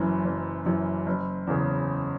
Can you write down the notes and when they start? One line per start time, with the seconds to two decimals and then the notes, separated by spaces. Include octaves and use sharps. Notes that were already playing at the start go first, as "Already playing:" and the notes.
Already playing: F#1 F#2 E3
0.25 F#1
0.65 F#2 E3
1.06 F#1
1.47 E2 C#3